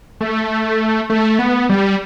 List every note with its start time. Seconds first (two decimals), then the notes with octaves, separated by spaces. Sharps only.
0.21 A3
1.10 A3
1.39 B3
1.69 G3